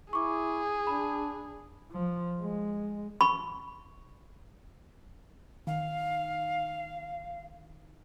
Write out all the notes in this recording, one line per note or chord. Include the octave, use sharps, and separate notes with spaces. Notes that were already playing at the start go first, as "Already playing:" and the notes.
E4 G#4 C#6 D6
D4 B5
F3
G#3
B5 C#6
D#3 F5